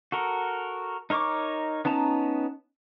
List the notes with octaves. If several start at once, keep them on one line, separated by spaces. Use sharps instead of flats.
F#4 A4 A#4
D#4 A#4 C#5 C#6 D6
B3 C#4 D#4 A5 A#5